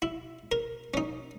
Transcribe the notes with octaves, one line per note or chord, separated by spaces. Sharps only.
E4
A#4
C#4 D#4